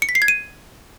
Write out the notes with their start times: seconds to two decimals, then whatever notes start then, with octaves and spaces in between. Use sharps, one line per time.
0.02 C#7
0.09 B6
0.15 C7
0.22 G#6
0.28 D#7